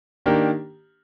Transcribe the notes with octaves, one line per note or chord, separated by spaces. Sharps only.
D#3 A#3 D4 G4 A#4